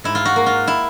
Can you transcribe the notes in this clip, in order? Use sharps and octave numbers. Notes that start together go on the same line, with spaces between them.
G#2 E4
F4
F#4
A#3
F4
E4